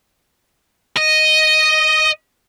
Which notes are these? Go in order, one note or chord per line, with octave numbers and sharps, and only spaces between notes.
D#5